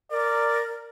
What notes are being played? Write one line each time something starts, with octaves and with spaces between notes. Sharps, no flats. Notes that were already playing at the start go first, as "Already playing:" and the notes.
A#4 D5